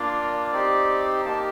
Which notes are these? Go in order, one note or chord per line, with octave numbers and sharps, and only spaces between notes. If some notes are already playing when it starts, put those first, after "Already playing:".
Already playing: A#3 D4 F4 D5
C4 D#4 G4 D5
A#3 D#4 G4 A5